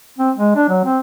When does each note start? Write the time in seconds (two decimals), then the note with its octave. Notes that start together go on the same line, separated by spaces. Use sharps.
0.18 C4
0.36 G#3
0.56 D4
0.69 F#3
0.85 C4